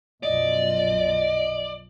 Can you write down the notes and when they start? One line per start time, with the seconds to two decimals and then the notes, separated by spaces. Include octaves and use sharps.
0.23 B1 F#2 F3 D5 D#5